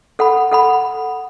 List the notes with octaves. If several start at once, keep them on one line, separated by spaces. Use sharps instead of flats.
A4 F#5 B5
A4 F#5 B5